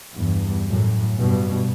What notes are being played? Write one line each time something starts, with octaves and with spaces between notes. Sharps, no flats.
E2 G2
F#2 A2
G2 B2